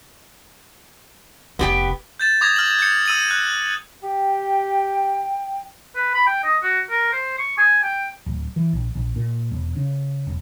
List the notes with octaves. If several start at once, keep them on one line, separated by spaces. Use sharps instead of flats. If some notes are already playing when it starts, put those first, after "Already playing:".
F1 B3 G4 G5
G6 A6 E7
D6 D#6 G#6 A#6 F7
F6 F#7
G6 C#7
E6 D#7 F#7
F#6
G4 G5
B4
B5
G5
D#5
F#4
A#4
C5
C#6
G#5
G5
D1
E3
A#1
A#1
A#2
E1
C#3
E1